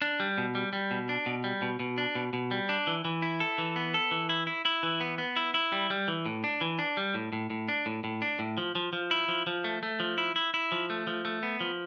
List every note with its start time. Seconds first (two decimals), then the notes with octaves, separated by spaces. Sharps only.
0.02 D4
0.20 G3
0.38 B2
0.55 G3
0.73 G3
0.91 B2
1.09 D4
1.26 B2
1.44 G3
1.62 B2
1.80 B2
1.98 D4
2.15 B2
2.33 B2
2.51 G3
2.69 D4
2.87 E3
3.05 E3
3.22 E4
3.40 A4
3.58 E3
3.76 B3
3.94 A4
4.11 E3
4.29 E4
4.47 E4
4.65 E4
4.83 E3
5.01 B3
5.18 B3
5.36 E4
5.54 E4
5.72 G3
5.90 G3
6.08 E3
6.26 A2
6.44 D4
6.61 E3
6.79 D4
6.97 G3
7.14 A2
7.33 A2
7.50 A2
7.68 D4
7.86 A2
8.04 A2
8.22 D4
8.39 A2
8.58 F3
8.75 F3
8.93 F3
9.11 E4
9.29 F3
9.47 F3
9.64 A3
9.83 A3
10.00 F3
10.18 E4
10.36 E4
10.54 E4
10.72 F3
10.90 A3
11.07 F3
11.25 A3
11.43 B3
11.61 F3